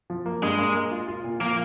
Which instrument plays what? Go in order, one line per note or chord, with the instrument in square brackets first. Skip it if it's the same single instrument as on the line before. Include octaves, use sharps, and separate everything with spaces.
[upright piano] F3
A#3
[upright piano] G2 [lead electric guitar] G#3
[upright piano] A#3
A#3
F4
F4
A#2
[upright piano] F3 [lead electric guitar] A#3